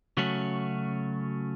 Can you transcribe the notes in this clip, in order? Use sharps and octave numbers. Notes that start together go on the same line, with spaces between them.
C#3 F#3 A3 C#4 F#4